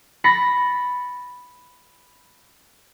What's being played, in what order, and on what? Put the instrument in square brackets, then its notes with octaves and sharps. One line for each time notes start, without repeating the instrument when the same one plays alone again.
[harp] B5 A6 A#6 C#7